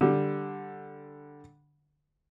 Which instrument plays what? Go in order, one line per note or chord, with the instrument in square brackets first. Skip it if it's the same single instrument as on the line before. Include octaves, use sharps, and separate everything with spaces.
[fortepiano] D3 G3